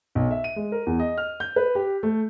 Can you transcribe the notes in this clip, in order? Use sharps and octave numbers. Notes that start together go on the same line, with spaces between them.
B1
E5
D#7
G#3
A#4
E2
D#5
F6
G6
B4
G4
A3